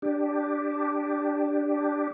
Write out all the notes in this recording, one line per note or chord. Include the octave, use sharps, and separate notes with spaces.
D4 G4